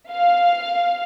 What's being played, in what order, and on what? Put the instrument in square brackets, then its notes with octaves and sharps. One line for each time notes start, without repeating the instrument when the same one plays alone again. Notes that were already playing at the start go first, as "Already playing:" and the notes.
[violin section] F5